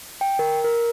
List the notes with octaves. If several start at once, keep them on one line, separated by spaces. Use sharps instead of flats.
G5
A#4
A#4